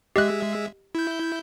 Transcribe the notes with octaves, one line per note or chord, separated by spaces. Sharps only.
G#3 G4 D#5 E5 F#6
E4 G6